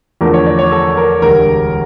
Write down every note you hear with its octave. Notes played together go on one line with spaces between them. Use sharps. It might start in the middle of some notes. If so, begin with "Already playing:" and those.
E2 D3 F3 A3 A#4
C#5
D5
C#5
A4
A#4
E1 D2 D3 G3 A#4